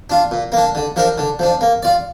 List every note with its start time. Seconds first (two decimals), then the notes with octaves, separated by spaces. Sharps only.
0.10 D4 F4
0.31 A#2
0.52 A#3 D4
0.75 D3
0.96 F3 D4 A#4
1.18 D3
1.39 F3 D4
1.61 A#3
1.83 F4 D5